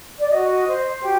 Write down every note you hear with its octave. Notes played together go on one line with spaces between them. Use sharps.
D5
F#4 D#5
C5
F#4 G4 G5